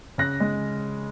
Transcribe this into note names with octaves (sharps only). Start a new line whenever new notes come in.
C#3 F#6 A#6
G#3